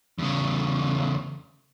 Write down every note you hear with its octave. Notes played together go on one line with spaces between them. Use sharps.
E2 C#3